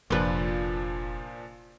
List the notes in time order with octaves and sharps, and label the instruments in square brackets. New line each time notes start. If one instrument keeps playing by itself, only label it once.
[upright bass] F1 [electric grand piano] A#2 F3 D4 [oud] F4 B4